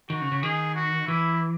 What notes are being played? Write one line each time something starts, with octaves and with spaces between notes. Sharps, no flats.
D#3 F#4
C#3
C#3
D#3 G#4
F#4
E3 E4